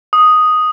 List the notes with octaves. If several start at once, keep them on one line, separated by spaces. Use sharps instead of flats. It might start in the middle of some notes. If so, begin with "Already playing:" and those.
D#6